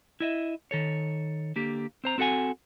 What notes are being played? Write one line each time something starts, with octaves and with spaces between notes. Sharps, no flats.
E4 D#5 E5
D#3 A4 C#5
D3 A#3 G4
C4 C5 A#5
C4 F#4 A4 F#5 G#5